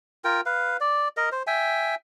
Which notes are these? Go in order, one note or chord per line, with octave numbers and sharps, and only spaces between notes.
F4 A#4 G5
B4 F5
D5
A#4 D#5
C5
E5 G5 G#5